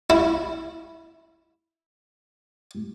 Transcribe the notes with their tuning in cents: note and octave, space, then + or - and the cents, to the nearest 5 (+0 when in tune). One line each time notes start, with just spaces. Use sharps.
E4 -5